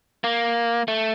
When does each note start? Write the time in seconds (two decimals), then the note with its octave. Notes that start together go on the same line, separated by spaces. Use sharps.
0.24 A#3
0.88 A3